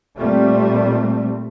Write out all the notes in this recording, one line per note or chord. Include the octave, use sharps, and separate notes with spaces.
A#2 G3 A3 C4